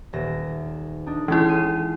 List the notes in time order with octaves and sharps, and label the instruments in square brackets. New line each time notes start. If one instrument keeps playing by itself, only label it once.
[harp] D#1 A#6 E7
D4 D#4
[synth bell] E3 E4 [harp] G#3 C#4 F4
[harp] C7 D#7